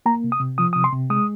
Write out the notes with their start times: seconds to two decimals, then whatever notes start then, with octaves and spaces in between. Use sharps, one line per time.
0.06 A#3 A#5
0.24 C3
0.32 D#6
0.40 C3
0.58 F3 D#6
0.73 C3 D#6
0.84 C6
0.93 C3
1.10 G#3 D#6